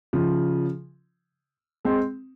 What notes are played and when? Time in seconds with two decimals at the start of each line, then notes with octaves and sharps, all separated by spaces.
0.13 C#3 F3
1.85 G#3 C4